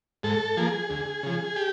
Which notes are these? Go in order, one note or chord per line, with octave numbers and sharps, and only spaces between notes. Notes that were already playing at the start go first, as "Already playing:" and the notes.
G#2 A4
F3 A#3 G#4
D2
C#3 F3
G4